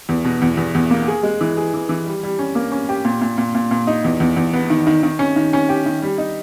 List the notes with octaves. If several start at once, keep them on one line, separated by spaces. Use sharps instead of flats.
E2
B2
E2
E2
E2
A#3
G#4
G#3
E3
G#4
E3
E3
G3
G3
C#4
A#3
C#4
G4
A#2
A#2
A#2
A#2
A#2
D#4
E2
E2
E2
B3
D#3
D#3
D#3
C#4
D#3
C#4
G4
D#3
G3
D#4